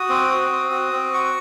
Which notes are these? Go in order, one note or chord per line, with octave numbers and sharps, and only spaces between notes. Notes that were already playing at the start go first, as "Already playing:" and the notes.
Already playing: F#4 D#6
C4
F#4
C4
F#4
C4
F#4 C#6